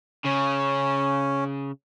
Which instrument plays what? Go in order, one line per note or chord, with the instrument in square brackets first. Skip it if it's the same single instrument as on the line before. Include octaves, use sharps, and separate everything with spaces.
[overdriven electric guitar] C#3 [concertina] C#4